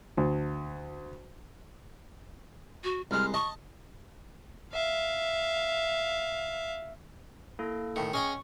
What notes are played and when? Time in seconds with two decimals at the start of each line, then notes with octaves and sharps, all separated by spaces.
0.17 D2
2.84 F#4
3.11 C2 G#3 F6
3.34 D#5 A5 C#6
4.73 E5 F5
7.59 A#3 E4 A4
7.96 A2 D#3 C#7
8.13 C#4 G#4 D#5 G5 C#6